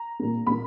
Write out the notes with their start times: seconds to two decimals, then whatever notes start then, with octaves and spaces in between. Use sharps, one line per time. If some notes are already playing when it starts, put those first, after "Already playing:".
Already playing: A#5
0.19 A#2 A#3
0.47 A#2 A#3 B5